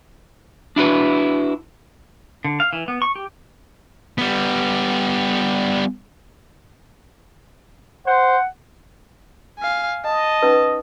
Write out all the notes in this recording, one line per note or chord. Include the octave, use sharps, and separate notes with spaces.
D4 E4 F#4 B4
D3
F5
E3
B3
C#6
G4
G3 B3
C5 F#5
F5 G#5
D#5 A5
C#4 D#4 B4